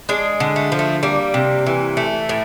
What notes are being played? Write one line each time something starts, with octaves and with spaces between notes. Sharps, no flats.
G#3 D4
D3
A3
F3
A3
G3 A#3
C3
E3
A3
A2